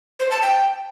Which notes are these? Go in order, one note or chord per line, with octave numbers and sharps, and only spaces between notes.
C5
A5
G5